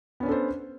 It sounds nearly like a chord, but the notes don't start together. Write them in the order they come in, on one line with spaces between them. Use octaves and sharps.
B3 C#4 D4 A4 C5